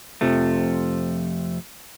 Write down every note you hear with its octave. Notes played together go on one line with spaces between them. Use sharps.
F2 C3 F3 A3